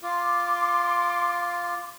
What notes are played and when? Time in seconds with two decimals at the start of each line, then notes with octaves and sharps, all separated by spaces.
0.03 F4 C6 D6